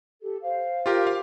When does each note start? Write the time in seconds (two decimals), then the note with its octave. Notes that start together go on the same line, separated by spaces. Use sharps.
0.21 G4 A4
0.41 C5 F5
0.86 F4 G4 A#4
1.07 F5